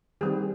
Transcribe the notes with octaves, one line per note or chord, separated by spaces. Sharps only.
D#3 G3 C4 G#4